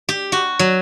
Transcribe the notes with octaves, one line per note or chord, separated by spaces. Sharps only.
G4
F#4
F#3